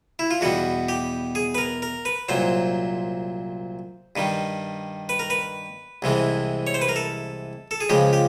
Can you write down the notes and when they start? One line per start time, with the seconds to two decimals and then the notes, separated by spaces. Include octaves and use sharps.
0.19 E4
0.31 F4
0.41 E2 B2 G3 F#4
0.89 G4
1.35 G#4
1.55 B4
1.58 A#4
1.82 A#4
2.05 B4
2.29 C2 A#2 F#3 C5
4.16 G2 D#3 G3
5.09 B4
5.19 A#4
5.30 B4
6.02 C2 C3 E3 G#3
6.67 C#5
6.74 C5
6.82 B4
6.89 A#4
6.96 A4
7.71 A4
7.81 G#4
7.89 C#2 C#3 F3 G#3 G4
8.13 G4